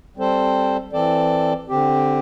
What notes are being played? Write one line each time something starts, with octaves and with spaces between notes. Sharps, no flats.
G3 C4 A4 C5
E3 C4 A4 D5
D3 C4 G4